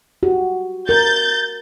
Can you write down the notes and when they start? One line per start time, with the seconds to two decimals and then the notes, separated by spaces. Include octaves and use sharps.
0.23 F#4 G4
0.89 A#4 G6 A6